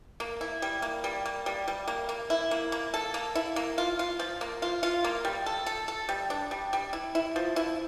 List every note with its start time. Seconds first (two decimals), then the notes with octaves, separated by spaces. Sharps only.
0.20 A#3
0.41 E4
0.62 G3
0.82 A#3
1.04 G3
1.26 A#3
1.46 G3
1.68 G3
1.88 A#3
2.09 A#3
2.30 E4
2.51 A#3
2.72 A#3
2.94 A4
3.14 A#3
3.35 E4
3.56 A#3
3.78 F4
3.99 F4
4.19 F3
4.41 A#3
4.62 F4
4.83 F4
5.04 A#3
5.25 G3
5.46 A4
5.66 A4
5.88 A4
6.09 G3
6.30 D4
6.51 G3
6.73 G3
6.93 E4
7.15 E4
7.36 F3
7.56 E4